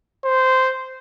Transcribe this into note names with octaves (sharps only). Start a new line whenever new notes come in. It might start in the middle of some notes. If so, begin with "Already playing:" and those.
C5